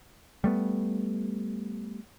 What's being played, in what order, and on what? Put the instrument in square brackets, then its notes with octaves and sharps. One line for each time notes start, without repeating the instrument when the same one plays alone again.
[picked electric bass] G3 A3 B3